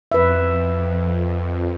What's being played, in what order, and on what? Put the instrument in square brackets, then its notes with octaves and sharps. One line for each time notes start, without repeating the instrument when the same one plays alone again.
[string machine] F2 [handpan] B4 E5